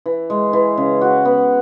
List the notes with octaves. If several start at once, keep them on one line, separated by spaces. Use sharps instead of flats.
E3
G#3
E3
C#3
F#4
B3